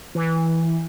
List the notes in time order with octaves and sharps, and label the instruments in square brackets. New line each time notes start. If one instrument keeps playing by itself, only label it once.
[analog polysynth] E3